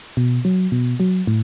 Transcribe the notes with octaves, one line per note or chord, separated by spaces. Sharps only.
B2
F#3
B2
F#3
A2